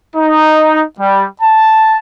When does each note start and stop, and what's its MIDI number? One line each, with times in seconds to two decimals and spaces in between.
0.16 0.83 63
0.99 1.26 55
1.42 1.98 81